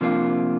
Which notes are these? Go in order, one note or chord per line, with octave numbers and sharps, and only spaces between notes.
C3 F3 A#3 D4 F4